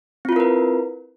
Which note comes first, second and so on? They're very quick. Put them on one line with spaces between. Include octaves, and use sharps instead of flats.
C4 F4 E4 A#4 B4